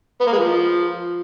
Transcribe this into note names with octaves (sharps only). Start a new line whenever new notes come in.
B3
A#3
G#3
F3